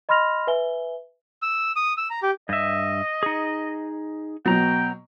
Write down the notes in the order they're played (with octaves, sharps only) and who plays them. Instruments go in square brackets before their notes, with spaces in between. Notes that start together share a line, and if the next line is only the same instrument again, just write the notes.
[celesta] D#5 B5 C6 F6 A#6 F7
B4 E5 G#5 G7
[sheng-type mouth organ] E6
D#6
E6
A#5
G4
[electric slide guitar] G2 E5 [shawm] D#5
[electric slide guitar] D#4 G#4
[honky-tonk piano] B2 F#3 [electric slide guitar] B3 A#5 [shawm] G5